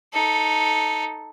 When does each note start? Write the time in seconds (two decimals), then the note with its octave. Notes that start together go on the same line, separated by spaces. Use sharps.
0.13 D#4 A4